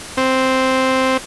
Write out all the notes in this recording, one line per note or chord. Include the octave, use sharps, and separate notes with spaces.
C4